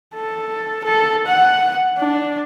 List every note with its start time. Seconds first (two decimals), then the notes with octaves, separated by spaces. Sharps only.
0.14 A4
0.84 A4
1.26 F#5
1.98 D4